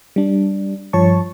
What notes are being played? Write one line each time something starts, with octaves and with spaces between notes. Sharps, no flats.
G3 D4
G2 F3 C#5 A5 C#6